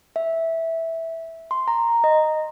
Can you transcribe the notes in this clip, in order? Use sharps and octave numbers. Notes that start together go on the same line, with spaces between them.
E5
C6
A#5
D#5